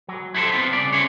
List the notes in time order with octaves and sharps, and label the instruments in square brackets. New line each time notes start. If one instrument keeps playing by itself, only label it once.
[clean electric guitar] F#3
E4 G4 A4 A#4 C5
B3 C4 F4
C2 C#3 D5
C4 C#4 E4 G#4 C#5